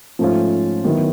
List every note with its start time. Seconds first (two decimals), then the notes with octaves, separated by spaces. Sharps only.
0.19 G#2 F3 A3 C#4 F4
0.84 D#3 F#3 B3 E4